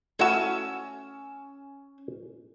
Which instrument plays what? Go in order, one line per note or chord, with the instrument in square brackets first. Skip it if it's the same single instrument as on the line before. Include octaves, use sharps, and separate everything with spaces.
[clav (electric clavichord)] A3 E4 F#4 [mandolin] C#4 E6